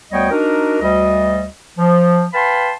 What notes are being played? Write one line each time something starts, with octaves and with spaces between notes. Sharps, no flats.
D2 G3 B3 C#5 D#5 G5
D4 D#4 F#4 A#4
D2 G3 D#5
F3
B4 F5 G5 A5 B5 C6